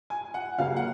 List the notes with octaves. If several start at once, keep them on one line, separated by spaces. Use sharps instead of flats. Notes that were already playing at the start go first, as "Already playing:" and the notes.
G#5
F#5
C#2 C#3 F#3 A#3 F5
F#5